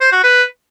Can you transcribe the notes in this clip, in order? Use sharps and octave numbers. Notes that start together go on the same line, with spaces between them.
C5
F#4
B4